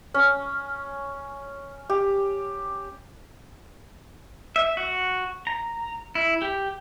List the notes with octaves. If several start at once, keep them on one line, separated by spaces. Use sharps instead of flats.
C#4
G4
E5
F#4
A#5
E4
G4